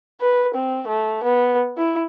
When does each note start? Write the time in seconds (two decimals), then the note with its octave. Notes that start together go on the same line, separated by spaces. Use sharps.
0.20 B4
0.54 C4
0.88 A3
1.24 B3
1.77 E4